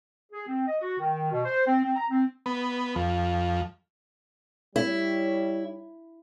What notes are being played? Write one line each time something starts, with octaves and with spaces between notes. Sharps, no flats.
G#4
C4
D#5
F#4
D#3
B2
C5
C4
C4
A#5
C4
B3
F2
G3 E4 C#5